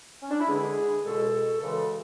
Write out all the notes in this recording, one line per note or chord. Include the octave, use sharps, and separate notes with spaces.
C#4
D4
E4
E2 D3 G#3 G#4
C#2 B2 G#3 A4
F#2 C#3 E3 G#3 A4